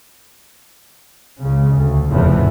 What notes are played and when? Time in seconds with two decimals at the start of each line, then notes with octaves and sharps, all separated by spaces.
1.41 C#2 C#3
1.75 D2
2.10 F1 E2 A2 C#3 E3 F3